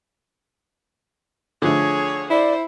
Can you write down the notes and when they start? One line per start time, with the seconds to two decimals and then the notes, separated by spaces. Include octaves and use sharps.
1.62 D3 F3 A3 G#4 C#5
2.30 E4 C5 D5